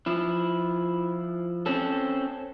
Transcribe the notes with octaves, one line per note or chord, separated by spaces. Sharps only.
F3 E4
C4 C#4 A4